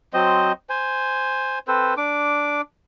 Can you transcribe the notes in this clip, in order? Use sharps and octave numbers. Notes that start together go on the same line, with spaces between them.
F#3 C4 C5 D#5
C5 G#5
C4 A4 B4 C5
D4 D6